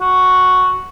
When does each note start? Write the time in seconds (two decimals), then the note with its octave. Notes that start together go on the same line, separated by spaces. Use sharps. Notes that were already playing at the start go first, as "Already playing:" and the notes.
0.01 F#4